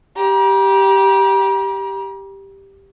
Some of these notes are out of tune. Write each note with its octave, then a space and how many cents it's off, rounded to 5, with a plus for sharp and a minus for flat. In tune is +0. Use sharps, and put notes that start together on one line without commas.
G4 +0 A#5 +45